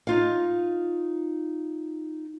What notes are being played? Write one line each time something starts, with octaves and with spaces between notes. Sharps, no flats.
D#4 F4 F5